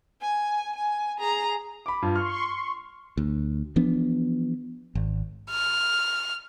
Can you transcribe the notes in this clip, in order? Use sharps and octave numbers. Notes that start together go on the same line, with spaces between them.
G#5
G#5
G#4 A#5
B5 D6
G2 F4
C6 C#6 F6
D2
E3 F3 B3 D4
G#1
F6